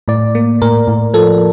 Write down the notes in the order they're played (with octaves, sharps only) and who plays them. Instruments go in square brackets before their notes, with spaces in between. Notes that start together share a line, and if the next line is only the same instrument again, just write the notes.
[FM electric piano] A2 D5
A#3
A2 A#4
A2
F3 A4